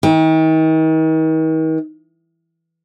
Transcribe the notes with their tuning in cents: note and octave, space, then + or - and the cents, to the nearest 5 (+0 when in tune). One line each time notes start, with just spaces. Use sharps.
D#3 +40